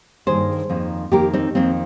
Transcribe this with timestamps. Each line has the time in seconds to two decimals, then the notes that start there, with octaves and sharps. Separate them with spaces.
0.26 G2 D#3 A#3 G#4 C5
0.70 F2 D#3 A#3
1.11 F2 D#3 A#3 G4 A#4
1.33 C4 D#4
1.55 F2 D#3 A#3 C4